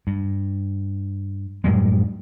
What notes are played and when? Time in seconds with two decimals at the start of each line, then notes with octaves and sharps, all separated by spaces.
0.07 G2
1.64 F#2 A2 G3 G#3